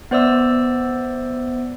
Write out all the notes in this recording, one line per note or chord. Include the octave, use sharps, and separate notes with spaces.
B3 C5 D5 E5 E6